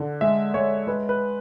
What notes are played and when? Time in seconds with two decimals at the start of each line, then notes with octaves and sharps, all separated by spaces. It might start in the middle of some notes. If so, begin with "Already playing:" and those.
Already playing: D3
0.21 G#3 E5
0.54 G#3 C#5
0.87 G#3 B4
1.09 B4